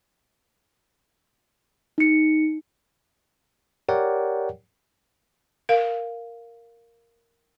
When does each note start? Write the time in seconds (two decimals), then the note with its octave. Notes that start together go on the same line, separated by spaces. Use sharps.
1.98 D#4 C#7
3.89 G4 A#4 C#5 D5 F#5 G5
5.69 A#4 F5